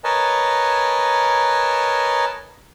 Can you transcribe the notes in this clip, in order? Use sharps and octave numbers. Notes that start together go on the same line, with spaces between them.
A#4 B4 C#5 D#5 G#5 A5